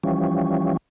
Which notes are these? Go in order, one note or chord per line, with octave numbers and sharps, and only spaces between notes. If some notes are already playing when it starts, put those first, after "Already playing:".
E3 F3 G3 C#4